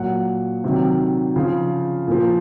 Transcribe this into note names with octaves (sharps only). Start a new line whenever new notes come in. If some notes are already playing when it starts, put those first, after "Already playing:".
Already playing: A#2 F#3 F#5
C3 D#3 F#3
C#3 F3
A#2 F3